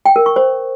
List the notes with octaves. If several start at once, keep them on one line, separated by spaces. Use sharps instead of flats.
G5
A#4
C#6
C5